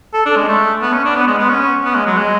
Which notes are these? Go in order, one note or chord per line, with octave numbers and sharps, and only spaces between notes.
A4
D4
G#3
A3
B3
C#4
D4
B3
G#3
B3
C#4
B3
G#3
F#3
G#3